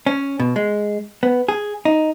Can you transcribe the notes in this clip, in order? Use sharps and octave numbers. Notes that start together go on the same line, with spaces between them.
C#4
B2
G#3
B3
G#4
D#4